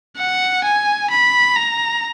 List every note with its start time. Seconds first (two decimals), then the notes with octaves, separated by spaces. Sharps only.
0.17 F#5
0.64 G#5
1.11 B5
1.57 A#5